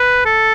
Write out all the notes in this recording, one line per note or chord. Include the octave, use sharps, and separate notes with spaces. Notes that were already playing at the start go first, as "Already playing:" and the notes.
Already playing: B4
A4